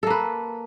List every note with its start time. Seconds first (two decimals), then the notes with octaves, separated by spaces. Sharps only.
0.03 A4
0.07 A#3
0.10 B4